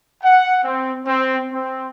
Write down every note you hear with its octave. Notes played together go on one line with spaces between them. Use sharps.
F#5
C4
C4
C4